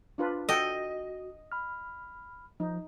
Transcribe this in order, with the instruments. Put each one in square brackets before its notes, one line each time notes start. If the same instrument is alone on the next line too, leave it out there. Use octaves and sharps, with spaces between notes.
[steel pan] D4 F4 B4
[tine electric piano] F#4 [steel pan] A4 F#5 G5 [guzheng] D#5
[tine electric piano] B5 F6
[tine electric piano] F3 [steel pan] D#4